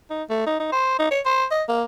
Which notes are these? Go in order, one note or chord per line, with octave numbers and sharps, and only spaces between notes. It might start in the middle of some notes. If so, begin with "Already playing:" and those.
D#4
A3
D#4
D#4
C5
D#4
C#5
C5
D#5
A#3